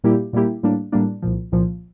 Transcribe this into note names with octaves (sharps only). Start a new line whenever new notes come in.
A#2 G3 A#3 E4 G4
A#2 G3 A#3 E4 G4
A2 G3 A#3 D4
A2 G3 A#3 D4
C2 A#2 F3
C2 A#2 F3